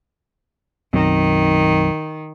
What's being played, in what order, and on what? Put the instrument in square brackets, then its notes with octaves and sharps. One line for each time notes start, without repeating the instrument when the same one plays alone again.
[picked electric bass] B1 F#2 C4 [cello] D#3